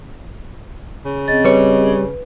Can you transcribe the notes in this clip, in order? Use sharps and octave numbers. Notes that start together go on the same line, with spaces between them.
C#3
C4 G#4 D#5 A6
G3 B4 C#5